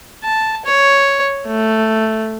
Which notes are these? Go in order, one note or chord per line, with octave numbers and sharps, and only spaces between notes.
A5
C#5
A3